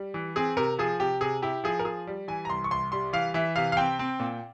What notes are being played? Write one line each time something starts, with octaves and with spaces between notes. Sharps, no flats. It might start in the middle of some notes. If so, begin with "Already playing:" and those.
Already playing: G3
E3
C4 G#4
C3 A#4
F3 G#4
C3 G4
C3 G#4
E4 G4
F3 G#4
A#4
F3 G#4
G3
E3 G#5
A#5
C2 C6
C#6
C2 C6
G3 C6
E3 F5
E3 E5
C3 F5
F5
C4 G5
C4
A#2